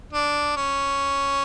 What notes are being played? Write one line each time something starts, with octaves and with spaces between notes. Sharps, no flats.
D4
C#4